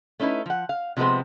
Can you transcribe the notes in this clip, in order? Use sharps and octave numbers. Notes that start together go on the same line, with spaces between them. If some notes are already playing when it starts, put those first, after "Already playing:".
A3 C#4 D#4 E4 B4
F3 F#5
F5
C3 F3 G3 G#3 B3 C4